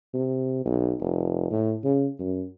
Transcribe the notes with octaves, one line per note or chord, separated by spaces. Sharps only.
C3
B1
F1
A2
C#3
F#2